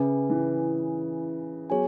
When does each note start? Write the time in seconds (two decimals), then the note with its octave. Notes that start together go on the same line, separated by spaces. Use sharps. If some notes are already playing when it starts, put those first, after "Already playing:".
Already playing: C#3 C#4 G#4 B4 E5 G#5
0.30 E3
1.70 F#3 B3 G#4 C#5 G#5